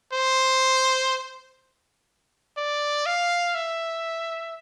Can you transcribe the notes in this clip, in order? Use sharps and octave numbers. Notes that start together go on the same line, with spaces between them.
C5
D5
F5
E5